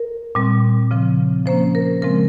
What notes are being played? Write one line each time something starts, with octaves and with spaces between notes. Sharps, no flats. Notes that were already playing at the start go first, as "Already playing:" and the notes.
Already playing: A#4
A#2 G3 C4
C#3 F3 C4
F3 A#3 C#4 C5
A#4
C#3 F3 G#3 C4 A#4